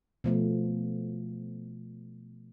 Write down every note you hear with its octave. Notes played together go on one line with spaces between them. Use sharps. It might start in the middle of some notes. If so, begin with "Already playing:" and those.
B2 F3 A3